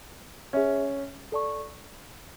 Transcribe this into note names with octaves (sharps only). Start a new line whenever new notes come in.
C#4 G#4 C#5 E5
A4 D5 A5 C#6